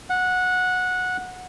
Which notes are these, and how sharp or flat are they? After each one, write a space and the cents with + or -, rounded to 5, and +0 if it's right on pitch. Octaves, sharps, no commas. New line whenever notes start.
F#5 -15